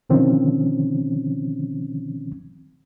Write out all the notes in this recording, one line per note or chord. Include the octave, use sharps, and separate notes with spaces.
B2 D3 D#3 F3 C4 C#4